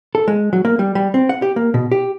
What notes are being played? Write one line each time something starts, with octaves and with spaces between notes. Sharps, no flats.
A4
G#3
F#3
A#3
G3
G3
C4
F#5
G4
A#3
B2
G4